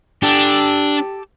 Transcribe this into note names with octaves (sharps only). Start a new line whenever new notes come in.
D4 G4 A4